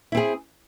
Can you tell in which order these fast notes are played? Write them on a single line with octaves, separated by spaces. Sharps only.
E4 C4 G#4